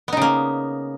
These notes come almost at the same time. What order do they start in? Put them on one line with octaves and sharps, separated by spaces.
B3 D#4 C#3 A#3